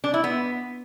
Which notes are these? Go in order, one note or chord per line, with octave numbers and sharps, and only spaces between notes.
D4
E4
B3